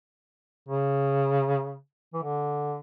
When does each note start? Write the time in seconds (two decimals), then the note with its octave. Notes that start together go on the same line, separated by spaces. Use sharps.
0.68 C#3
2.14 E3
2.23 D3